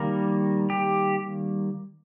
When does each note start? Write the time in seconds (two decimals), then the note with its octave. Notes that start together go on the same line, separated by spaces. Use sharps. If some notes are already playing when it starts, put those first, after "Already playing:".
Already playing: D#3 G3 A#3 A#4
0.70 G4